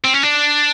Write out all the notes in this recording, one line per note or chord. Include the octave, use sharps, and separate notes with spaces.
C4
C#4
D4